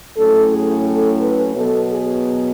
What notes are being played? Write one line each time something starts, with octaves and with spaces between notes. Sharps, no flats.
A2 F#3 A3 C#4 A4
G#4
A4
B4
B2 F#3 B3 A4
G#4